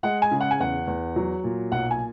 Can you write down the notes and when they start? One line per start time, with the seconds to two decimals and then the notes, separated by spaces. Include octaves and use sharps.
0.03 G#3 F#5
0.22 G#5
0.31 C#3
0.41 F#5
0.51 G#5
0.60 E2 F#5
0.87 E2
1.16 F#3
1.44 A#2
1.72 B1 F#5
1.91 G#5